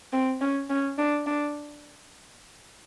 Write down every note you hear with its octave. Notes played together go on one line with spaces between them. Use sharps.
C4
C#4
C#4
D4
D4